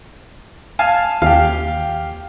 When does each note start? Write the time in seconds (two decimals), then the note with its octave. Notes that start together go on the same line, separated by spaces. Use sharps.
0.79 F5 G#5 A5
1.22 D#2 G4 F5